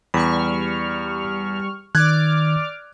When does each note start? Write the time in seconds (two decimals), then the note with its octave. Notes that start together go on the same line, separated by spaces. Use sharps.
0.14 E2 G3 B5 C#6 F6
1.95 D#3 D5 D6 F6 F#6 G#6